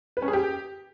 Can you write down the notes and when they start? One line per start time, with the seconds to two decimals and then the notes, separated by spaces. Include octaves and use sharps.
0.17 B4
0.22 C#4
0.28 G#4
0.33 G4